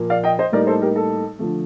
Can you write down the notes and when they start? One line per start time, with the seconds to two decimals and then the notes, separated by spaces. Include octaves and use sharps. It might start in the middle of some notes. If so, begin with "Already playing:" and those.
Already playing: A#2 F3 A#3
0.10 D5 F5
0.24 D#5 G5
0.39 C5 D#5
0.52 A2 G3 A#3 D#4 A#4 D5
0.67 A4 C5
0.82 G4 A#4
0.96 A4
1.39 D3 F3 A3